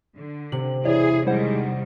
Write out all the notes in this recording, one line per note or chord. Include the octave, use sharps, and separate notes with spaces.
D3
C3 F#7
E1 E4 G#4 C#5 D5
D#3 G3 G#3 E4 C5 F#5